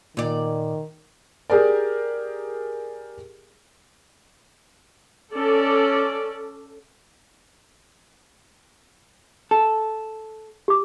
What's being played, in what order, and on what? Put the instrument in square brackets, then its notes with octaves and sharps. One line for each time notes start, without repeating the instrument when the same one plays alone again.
[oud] A#2 D5 [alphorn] D#3
[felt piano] G4 G#4 A#4 D5
[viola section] C#4 A4 D5
[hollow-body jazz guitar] A4
[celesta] G4 D6